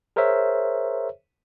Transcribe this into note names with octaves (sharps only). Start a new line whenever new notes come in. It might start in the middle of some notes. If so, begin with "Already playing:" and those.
G#4 A#4 C5 C#5 E5